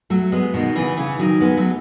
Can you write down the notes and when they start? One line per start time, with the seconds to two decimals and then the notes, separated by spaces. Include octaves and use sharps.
0.10 F#3 A3
0.32 G#3 B3
0.54 B2 D#3
0.75 C#3 E3
0.97 C#3 E3
1.19 D#3 F#3
1.41 G#3 B3
1.57 F#3 A3